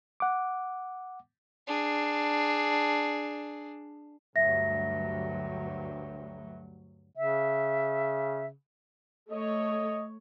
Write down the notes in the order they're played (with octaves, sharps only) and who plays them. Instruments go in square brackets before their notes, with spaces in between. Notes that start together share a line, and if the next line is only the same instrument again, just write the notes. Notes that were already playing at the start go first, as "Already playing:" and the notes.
[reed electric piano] F#5 D6
[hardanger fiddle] D4 G#4
[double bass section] D2 G2 F#3 [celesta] E5 A#6
[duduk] C#3 [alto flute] E5
[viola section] A3 C#5 [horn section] D#5